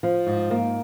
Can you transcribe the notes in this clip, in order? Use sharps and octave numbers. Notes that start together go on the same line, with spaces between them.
F3
G#2
A#3